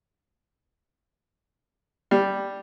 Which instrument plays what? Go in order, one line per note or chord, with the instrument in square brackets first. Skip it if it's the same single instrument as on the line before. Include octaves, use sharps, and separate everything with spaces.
[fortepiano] G3